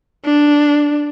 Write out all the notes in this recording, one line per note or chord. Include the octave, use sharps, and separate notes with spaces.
D4